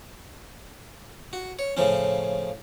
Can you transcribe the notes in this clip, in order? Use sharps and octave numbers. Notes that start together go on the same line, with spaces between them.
F#4
C#5
A2 C#3 F3 C#4